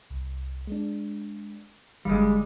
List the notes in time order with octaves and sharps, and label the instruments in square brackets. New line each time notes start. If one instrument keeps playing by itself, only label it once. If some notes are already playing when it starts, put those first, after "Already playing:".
[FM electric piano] C2
G#3 D4
[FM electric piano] G1 D3 F5 [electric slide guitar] G3 G#3